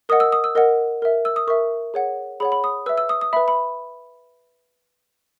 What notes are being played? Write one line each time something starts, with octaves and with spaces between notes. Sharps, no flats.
A#4 D#5 F#5 D#6
E6
D#6
E6
A#4 D#5 F#5
A#4 E5
E6
D#6
A#4 E5 C#6
G#4 C#5 F#5
G#4 C#5 F#5 B5
B5
D#6
B4 E5 E6
E6
D#6
D#6
B4 E5 B5
B5